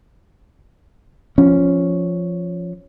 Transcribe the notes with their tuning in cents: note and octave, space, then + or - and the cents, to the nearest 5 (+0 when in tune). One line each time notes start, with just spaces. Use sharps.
F3 +0 C#4 +0